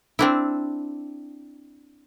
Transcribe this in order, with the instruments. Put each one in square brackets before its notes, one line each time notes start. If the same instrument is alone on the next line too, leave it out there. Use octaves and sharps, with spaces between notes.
[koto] C4 D4 E4